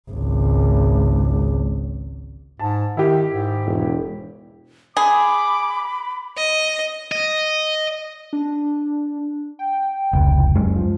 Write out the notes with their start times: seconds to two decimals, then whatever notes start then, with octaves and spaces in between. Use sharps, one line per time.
0.11 G#1 C#2
2.59 G#2 A5
2.97 D#3 E4 G4
3.30 G#2
3.65 E1
4.97 G#4 B5 D6
6.37 D#5
7.12 D#5
8.33 D4
9.59 G5
10.13 F1 C#2
10.55 F#2 G#3
10.76 F3